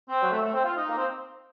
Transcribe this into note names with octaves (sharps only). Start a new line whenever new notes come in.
C4
F#3
A3
A3
C4
F4
D#4
A#3
C4